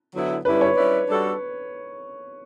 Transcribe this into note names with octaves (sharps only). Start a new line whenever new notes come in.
D3 F#3 B3 E4
G2 D3 G3 C#4 E4 B4
C#5
G3 C#4 E4 B4 D5
G3 D4 F#4 A4